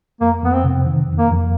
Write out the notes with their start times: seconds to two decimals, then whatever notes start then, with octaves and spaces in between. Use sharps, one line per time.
0.21 F2 A#3
0.42 F2 B3
0.53 C4
0.64 C3
0.86 D#3
1.09 F2
1.19 A#3
1.30 F2